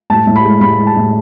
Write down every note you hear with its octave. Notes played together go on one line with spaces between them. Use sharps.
A2 A5
A2
B5
G#3
A2 B5
G#3
A5
A2